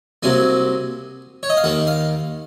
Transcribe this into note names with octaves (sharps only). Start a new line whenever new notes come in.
C2 C3 F#3 A#3 G#5
C#5
D#5
F5
D#2 D#3 A#3 F#5
F5